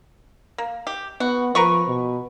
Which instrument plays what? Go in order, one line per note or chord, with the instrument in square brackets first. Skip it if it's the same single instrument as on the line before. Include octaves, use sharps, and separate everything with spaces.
[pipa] A#3
G4
[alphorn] B3 [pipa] F#4
[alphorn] F3 [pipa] A#4 B4 C#6
[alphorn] B2